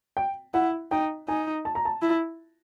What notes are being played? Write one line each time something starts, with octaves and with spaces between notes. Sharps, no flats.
G5
E4 F#5
D#4 G5
D#4 G#5
A5
A#5
A5
E4